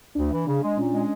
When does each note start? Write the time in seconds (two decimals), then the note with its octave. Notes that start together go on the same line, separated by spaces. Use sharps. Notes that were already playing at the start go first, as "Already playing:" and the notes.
0.15 D2 D4
0.32 E3
0.47 C#3 D4
0.62 G#3
0.77 A#2 C#4
0.92 G#3